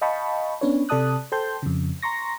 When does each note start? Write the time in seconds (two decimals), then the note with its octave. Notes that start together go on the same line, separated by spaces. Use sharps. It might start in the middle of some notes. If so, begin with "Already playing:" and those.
0.02 D#5 F5 G5 A5 B5 C#6
0.61 B3 C#4 D4 B4 C#5
0.89 C3 A4 D5 A5 D#6 F#6
1.32 A4 C5 G5 A5 C6 G6
1.62 F2 C#3
2.02 A#5 C6 C#6 A#6